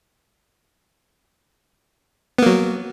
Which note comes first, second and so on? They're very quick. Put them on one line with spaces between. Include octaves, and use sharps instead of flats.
B3 A#3 F#3